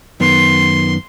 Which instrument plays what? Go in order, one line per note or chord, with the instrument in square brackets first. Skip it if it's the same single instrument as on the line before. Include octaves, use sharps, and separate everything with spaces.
[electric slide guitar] F#2 D#3 B3 [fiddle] C6